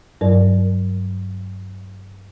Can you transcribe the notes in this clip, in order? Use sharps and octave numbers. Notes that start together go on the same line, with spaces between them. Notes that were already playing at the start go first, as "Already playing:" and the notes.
G2 F#3 A#4 D5